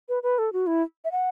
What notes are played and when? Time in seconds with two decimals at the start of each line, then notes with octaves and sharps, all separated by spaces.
0.09 B4
0.23 B4
0.39 A4
0.53 F#4
0.67 E4
1.05 E5
1.12 F#5